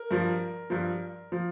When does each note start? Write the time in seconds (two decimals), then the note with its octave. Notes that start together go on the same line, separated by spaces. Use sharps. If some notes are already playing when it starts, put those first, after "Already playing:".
Already playing: A#4
0.11 G2 F3
0.70 G2 F3
1.32 F3